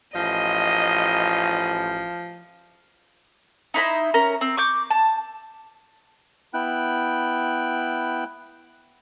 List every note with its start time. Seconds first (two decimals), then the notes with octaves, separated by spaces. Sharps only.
0.15 A1 F3 D#5
3.74 D#4 E4 C5 B5
4.14 C#4 A#4 A#5
4.41 C4
4.57 C#6 D6 G6
4.90 A5
6.54 B3 E4 G5 F#6